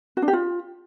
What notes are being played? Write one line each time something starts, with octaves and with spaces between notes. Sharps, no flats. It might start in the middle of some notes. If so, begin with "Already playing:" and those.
F#4
D4
G4
F4